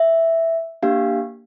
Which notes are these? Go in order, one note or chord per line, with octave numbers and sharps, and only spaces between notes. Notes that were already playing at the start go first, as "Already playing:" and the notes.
Already playing: E5
A#3 D4 G4 F5